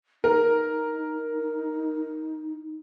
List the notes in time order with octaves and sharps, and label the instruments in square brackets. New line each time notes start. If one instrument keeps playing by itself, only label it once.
[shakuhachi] D#4 [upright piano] A#4